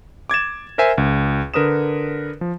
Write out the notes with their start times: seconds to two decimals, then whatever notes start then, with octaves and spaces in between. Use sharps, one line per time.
0.30 D6 G#6 A6 E7
0.78 A#4 C5 E5 G#5
0.98 C#2
1.54 D3 A#4 B4 D#6 E7
2.41 F3